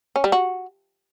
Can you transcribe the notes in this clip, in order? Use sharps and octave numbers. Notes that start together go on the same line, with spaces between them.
C#4
G3
F#4